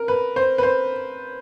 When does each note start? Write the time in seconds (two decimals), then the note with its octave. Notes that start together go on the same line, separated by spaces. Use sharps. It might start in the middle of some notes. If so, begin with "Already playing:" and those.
Already playing: A#4
0.08 B4
0.36 C5
0.58 B4
0.63 C5